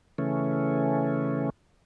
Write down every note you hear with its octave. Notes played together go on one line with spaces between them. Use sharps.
C#3 E3 A3 C#4